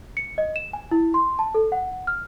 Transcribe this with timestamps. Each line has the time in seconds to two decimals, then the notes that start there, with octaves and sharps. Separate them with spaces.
0.17 C#7
0.38 D#5
0.56 E7
0.73 G#5
0.91 E4
1.14 C6
1.39 A5
1.54 A4
1.72 F#5
2.07 F6